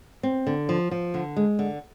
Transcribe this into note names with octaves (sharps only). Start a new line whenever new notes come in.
C4
D3
F3
F3
D3
G#3
D3